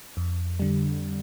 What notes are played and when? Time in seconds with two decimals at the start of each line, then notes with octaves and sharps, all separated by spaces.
0.17 F2
0.60 D3 G3